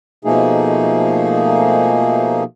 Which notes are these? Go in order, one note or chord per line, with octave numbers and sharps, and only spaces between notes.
B2 F3 A3 A#3 D#4 G#4